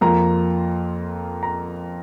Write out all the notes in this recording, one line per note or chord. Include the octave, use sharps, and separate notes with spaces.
F2 F3 A#3 F4 A#5
A#5